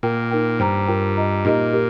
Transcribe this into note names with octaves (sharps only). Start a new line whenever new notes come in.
A#2 F4 A#4 G5
D#4 A#4 G5
G2 C5 G5 A#5
F4 A#4 G5 A#5
F4 D#5 A#5
A#2 D#4 G4 A#4 D#5
G4 A#4